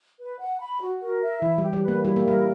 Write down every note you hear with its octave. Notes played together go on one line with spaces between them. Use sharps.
B4
F#5
B5
F#4
A#4
E5
E3 E4
G3
G4
G3
A#3 B4
G3 E4
A#3
G3 A#4